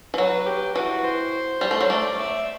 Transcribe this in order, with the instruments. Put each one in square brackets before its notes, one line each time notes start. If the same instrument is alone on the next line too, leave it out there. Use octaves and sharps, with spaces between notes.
[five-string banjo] E3
[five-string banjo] F#3 [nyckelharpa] B4
[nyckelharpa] G4
[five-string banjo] E3 [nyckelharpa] F#4
[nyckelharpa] C5
[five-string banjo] G3
A3
F#3
[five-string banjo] A3 [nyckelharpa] D5
[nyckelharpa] E5